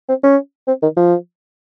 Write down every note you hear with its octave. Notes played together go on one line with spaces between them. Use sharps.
C4
C#4
C4
D#3
F3